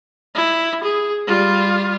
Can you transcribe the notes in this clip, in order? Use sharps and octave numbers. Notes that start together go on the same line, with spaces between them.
E4
G#4
G3 F4